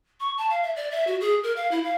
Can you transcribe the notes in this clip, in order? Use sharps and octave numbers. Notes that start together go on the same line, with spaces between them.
C#6
A5
F5
E5
D5
E5
F#4
G#4
A#4
F5
E4
F5